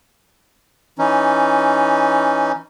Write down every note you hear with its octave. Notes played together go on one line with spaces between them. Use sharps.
E3 C#4 D#4